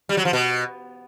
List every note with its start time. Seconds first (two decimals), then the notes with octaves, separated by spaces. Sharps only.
0.09 G3
0.17 F#3
0.25 F3
0.33 B2